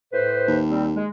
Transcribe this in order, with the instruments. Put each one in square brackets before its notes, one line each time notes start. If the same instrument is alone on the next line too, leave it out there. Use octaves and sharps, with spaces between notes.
[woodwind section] A2 B4 C5
[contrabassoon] D#2
[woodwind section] G3 C4
G#3